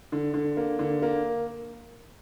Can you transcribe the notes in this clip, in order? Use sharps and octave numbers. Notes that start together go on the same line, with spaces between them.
D3
D3
A#3
D3
A#3